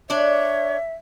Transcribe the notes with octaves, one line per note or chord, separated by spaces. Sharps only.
D4 C#5 D5 E5